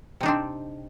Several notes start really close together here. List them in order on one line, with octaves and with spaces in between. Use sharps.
C3 D#4 D4 C4